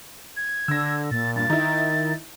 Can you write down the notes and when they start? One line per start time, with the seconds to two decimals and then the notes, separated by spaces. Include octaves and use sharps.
0.37 G#6
0.68 D3 E6 A#6
1.11 A#2 A6
1.36 G2 A6
1.50 D#3 D#4 E4